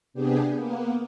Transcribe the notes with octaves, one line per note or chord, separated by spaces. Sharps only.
C3 B3 D4 G4 G#4
A#3 B3